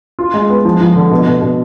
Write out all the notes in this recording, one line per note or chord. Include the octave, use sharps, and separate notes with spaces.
F4
G#3
B3
F3
F3
D3
B2
B2
B2